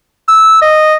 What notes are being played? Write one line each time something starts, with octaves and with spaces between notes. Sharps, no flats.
E6
D#5